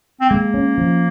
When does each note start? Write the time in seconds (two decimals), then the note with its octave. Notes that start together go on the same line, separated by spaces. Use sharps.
0.21 C4
0.30 G#3 A#3
0.54 C#4
0.78 F3